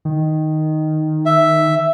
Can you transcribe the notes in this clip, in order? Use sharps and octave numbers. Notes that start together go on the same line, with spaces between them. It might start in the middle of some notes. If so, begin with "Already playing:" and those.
D#3
E5